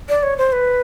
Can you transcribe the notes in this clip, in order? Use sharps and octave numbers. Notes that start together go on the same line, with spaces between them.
D5
C#5
C5
B4